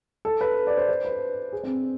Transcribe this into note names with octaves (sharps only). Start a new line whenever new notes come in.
A4
B4
D5
C5
C5
B4
G#4
C4